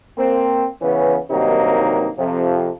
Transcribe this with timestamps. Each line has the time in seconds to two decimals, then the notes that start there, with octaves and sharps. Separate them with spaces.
0.18 A#3 C4
0.82 C#3 E3 B3 C#4
1.31 G2 C3 D#3 F#3 A#3 D#4
2.18 F2 C3 F3